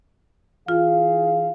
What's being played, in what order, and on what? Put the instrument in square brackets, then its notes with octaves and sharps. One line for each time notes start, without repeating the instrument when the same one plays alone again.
[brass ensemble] E3 G#4 F5 [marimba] F4